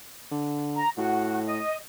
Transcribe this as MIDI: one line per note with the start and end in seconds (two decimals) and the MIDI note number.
0.31 0.81 50
0.76 0.89 82
0.97 1.60 45
0.97 1.44 66
1.46 1.76 75